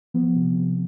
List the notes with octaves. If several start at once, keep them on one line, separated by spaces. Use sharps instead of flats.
F3 B3
C3
C3